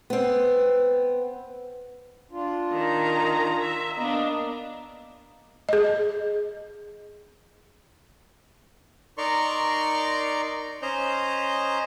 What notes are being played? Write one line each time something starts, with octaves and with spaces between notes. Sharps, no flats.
B3 C4
D4 F4
D#3 A#5
E5
A#3 B3 D4 D#5 A#5
G#4 D#5
D#4 A#4 D5 A#5 C6 C#6
C#4 C5 D#5 A#5 G6